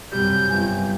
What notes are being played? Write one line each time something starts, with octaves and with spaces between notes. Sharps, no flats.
F#2 C3 G3 G6
G1 G#5